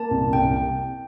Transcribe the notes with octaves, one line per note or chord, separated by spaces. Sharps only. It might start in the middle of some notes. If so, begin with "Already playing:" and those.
Already playing: A#3 A5
C2
C2 G5